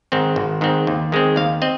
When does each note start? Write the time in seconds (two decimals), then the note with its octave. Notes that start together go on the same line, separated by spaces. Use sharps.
0.12 G#2 D#3 C4
0.36 G#1
0.61 G#2 D#3 C4
0.87 D#2
1.12 D#3 G#3 C4
1.36 D#2 F5
1.62 C4 D#5